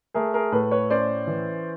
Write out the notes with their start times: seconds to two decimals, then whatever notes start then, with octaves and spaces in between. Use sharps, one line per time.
0.14 A3 G#4 A#4
0.34 G#4 A#4
0.52 A2 A4 B4
0.71 B4 C#5
0.90 C#4 C5 D5
1.27 E3